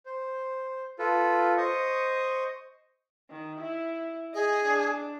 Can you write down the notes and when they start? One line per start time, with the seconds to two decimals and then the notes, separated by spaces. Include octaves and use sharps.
0.06 C5
0.99 F4 A4 B4
1.57 C5 D#5 C#6 D#6
3.30 D#3
3.60 E4
4.34 G#4 D#5
4.66 D4